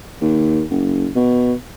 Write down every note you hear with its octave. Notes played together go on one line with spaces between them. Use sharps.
D#2
F#1
B2